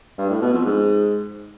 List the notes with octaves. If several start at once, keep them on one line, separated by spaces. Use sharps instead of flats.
G2
A2
B2
F2
G#2